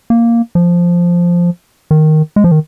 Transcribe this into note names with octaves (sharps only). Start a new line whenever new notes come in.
A#3
F3
D#3
G#3
F3
D#3